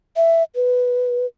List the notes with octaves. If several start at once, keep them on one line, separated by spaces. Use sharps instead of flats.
E5
B4